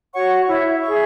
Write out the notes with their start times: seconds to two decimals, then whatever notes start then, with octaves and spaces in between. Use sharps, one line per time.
0.13 F#4 C#5 F#5 C#6
0.47 E4 C#5 E5
0.82 G#4 E5 C#6